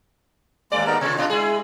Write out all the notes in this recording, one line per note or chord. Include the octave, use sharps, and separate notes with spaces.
D#2 G#2 G#3 A#3 D5 D6
B3 D#4 A#4
C3 F4 C#5
B2 D4 F4 D#5
G#3 E4 G#4